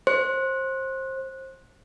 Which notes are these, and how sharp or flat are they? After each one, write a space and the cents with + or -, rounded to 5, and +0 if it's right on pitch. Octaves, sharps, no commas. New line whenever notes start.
C5 +20